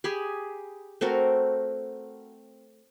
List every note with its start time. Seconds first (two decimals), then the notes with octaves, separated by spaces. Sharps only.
0.04 G4 G#4 G#5 B5
1.01 A3 C4 F#4 A#4